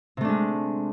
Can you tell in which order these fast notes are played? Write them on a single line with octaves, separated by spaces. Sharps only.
C3 A3 D4 G#3